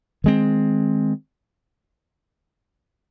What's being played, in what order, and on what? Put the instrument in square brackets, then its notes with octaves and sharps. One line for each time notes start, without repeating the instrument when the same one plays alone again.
[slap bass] D#3 G#3 C4